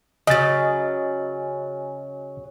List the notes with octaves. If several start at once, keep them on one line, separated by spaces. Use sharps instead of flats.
C#3 F#3 D#5 A6